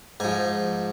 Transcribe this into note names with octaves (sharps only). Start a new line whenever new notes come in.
G#2 F3 G#5